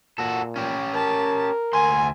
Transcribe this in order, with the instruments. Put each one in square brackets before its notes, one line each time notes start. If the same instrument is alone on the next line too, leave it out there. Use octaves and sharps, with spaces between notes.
[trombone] A#2 [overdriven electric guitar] F#4 A4
[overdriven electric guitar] C#4 G4
[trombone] A#4 [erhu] A5
[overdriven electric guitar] D2 C6 [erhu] G#5